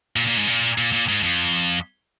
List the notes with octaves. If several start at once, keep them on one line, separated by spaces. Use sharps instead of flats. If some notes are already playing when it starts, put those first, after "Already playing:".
A#2
A#2
G#2
A#2
A#2
A#2
G#2
F2